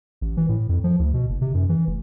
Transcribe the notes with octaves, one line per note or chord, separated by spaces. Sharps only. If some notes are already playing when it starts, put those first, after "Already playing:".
A1
E3
A2
F2
F3
D2
B2
F#1
C3
F#2
E3
F1